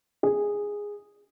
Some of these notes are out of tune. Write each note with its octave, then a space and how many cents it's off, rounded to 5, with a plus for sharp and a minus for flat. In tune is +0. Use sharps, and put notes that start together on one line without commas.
G#4 -10